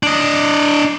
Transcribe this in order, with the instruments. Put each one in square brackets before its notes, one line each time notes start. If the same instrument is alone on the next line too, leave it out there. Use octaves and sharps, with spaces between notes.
[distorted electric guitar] D4 D#5